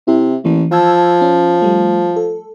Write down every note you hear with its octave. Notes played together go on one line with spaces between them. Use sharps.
C3 E4
A1 E3 A#3
F3 A5 E6 G#6
C#4
G3 A3
A4